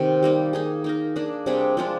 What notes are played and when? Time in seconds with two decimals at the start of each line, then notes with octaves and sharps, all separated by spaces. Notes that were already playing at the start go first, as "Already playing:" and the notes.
Already playing: C3 D#3
0.23 G3 A#3 D#4
0.53 A#3 D#4 G#4
0.84 A#3 D#4 A#4
1.16 A#3 D4 G#4
1.46 C3 G3 D4 G#4
1.77 F3 G#3 D4 F4